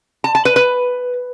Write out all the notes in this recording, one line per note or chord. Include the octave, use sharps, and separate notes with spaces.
A5
A5
B4
B4